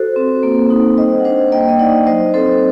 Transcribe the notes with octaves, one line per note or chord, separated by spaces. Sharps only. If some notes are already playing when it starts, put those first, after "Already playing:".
Already playing: F#4 A4 C5
C4
A#3
D#4
G3 C5 D#5
F#5
D4 C5 D#5
A#3 D#5 G5
D#5
D#4 D5 F#5
F#3 C5 D#5
C4 A4 C5